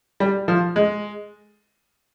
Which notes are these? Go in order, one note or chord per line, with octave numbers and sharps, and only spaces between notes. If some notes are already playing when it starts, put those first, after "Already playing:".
G3
F3
G#3